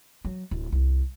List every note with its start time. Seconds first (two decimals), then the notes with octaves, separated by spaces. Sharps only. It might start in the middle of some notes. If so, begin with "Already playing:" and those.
0.25 F#3
0.51 D1
0.72 C2